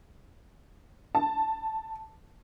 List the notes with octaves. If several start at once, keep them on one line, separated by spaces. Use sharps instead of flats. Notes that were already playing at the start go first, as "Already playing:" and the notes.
A5